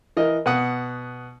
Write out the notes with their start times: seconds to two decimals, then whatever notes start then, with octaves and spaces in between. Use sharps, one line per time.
0.17 E3 A#4 D#5
0.46 B2 F#5 D#6